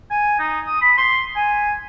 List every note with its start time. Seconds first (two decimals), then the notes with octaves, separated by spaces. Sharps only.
0.11 G#5
0.39 D#4
0.66 D#6
0.81 B5
0.98 C6
1.36 G#5